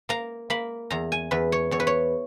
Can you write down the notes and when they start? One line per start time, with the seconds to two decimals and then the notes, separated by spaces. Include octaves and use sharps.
0.09 A#3 A#5
0.50 A#3 B5
0.90 E2 A#5
1.12 G#5
1.31 E2 B4
1.52 C#5
1.71 E2 C#5
1.80 B4
1.87 C#5